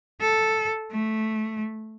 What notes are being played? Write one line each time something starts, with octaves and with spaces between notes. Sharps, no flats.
A4
A3